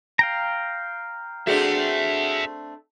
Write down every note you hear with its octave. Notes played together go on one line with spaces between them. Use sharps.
F5 G5 A#5
A3 C4 D4 F#4 G#4 E5 F#5